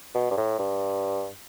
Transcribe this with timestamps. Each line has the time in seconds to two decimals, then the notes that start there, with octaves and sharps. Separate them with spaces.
0.15 B2
0.31 G2
0.37 A2
0.59 G2